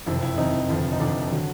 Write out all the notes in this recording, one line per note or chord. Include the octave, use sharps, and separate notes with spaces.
F#1 F2 C3 E4
E4
F#1 F2 C3 D#4
F1 F2 D3 F3
D#4
F1 F2 D3 F3 D4
D3 F#3